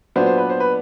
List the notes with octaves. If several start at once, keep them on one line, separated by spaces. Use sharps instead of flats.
A#2 F#3 B3 D4 C5
C5
B4
C5
B4